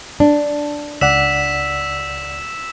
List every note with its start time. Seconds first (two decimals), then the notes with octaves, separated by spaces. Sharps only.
0.20 D4
1.01 C#2 D5 F#5 E6 B6 E7